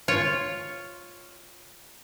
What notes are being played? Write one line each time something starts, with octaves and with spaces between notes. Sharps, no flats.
F4 C#5